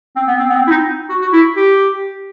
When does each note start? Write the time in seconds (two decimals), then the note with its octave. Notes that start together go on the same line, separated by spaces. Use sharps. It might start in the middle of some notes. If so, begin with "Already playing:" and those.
0.16 C4
0.27 B3
0.39 C4
0.50 B3
0.56 C4
0.67 E4
0.70 D#4
1.09 F#4
1.21 F#4
1.32 E4
1.56 G4